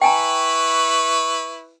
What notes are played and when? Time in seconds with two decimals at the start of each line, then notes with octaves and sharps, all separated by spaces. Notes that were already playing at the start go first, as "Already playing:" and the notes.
0.02 E4 B4 G5 G#5 A#5 C#6